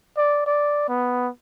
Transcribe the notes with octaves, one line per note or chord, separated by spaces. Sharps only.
D5
D5
B3